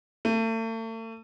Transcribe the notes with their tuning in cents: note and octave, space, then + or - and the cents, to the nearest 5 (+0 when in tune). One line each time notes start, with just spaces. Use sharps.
A3 +40